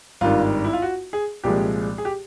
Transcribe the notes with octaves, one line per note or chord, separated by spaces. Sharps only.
G#1 G2 D#3 F4
E4
F4
F#4
G#4
C2 A#2 F3 G#3 G4
G#4
G4